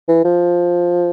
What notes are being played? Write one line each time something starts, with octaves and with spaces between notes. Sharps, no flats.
E3
F3